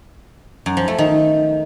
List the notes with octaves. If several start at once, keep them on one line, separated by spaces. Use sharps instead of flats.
F#2
F3
A3
D#3